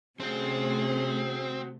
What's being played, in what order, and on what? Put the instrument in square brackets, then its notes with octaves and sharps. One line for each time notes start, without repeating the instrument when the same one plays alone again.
[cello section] C3 A3 [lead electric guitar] C4 [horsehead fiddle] C#4 G#4 [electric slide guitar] F#4 C5